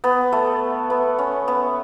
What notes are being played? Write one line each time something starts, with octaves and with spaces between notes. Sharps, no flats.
B3
A3
B3
C#4
B3